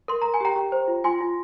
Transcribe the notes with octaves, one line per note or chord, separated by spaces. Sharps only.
A#4 C6
A#4 A#5
G#5
G4 G5 A#5
G4
C5
F4
F4 G#5 C6
F4